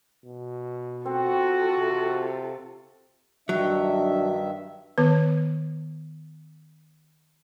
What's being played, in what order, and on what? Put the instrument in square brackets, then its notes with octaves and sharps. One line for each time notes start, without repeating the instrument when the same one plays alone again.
[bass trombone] B2
[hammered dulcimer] C4 [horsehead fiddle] F4 A4 [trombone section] F#4
[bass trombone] C3
[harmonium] G2 D#3 E5 [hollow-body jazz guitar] F#3 [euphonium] D4
[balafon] D#3 B3 B4